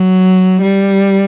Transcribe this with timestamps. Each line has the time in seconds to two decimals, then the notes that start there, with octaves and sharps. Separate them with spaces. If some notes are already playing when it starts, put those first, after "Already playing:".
Already playing: F#3
0.61 G3